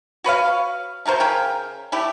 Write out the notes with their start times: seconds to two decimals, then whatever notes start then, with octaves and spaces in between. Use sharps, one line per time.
0.24 F#4 B4 C#5 F5
1.06 A3 F#4 A#4 C5
1.20 C#3 A#4 G5
1.92 A3 E4 G4